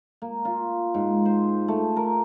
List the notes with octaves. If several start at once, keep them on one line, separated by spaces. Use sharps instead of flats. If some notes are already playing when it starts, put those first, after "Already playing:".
A#3
F4
G#2
C5
A3
A#4